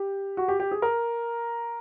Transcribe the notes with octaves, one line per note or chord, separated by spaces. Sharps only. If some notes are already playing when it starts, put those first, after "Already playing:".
Already playing: G4
F#4
G4
G4
G#4
A#4